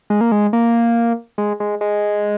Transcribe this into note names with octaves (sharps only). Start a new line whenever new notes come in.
G#3
A#3
G#3
A#3
G#3
G#3
G#3